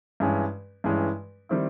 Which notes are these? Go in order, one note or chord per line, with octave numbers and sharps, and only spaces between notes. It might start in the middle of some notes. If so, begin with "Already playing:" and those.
G2 E3 G#3 C#4
G2 E3 G#3 C#4
D#3 G3 C4 E4